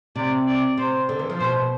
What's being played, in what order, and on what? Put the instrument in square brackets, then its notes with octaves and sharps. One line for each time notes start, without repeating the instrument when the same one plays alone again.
[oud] C3 [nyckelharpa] D5
[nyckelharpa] D5
[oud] C3 [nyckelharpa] C5
[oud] D3
E3
F3
[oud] B2 [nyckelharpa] C5